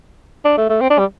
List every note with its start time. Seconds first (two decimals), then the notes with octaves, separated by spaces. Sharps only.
0.45 D4
0.57 A3
0.70 A3
0.81 C4
0.90 D4
0.98 G3